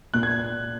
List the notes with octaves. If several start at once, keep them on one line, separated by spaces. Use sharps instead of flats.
A#2 F#6
G#6